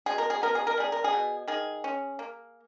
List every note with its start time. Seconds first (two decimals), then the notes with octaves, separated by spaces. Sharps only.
0.06 B2 G#4
0.18 A#4
0.30 G#4
0.42 B3 A#4
0.55 G#4
0.67 A#4
0.77 G3 G#4
0.92 A#4
1.04 G#4
1.12 B2
1.48 D#3 G#4
1.84 C#4
2.19 A#3